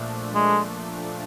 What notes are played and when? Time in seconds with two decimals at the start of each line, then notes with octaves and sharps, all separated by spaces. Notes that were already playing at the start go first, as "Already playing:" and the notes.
Already playing: A#2 F3 A3 D4
0.34 G#3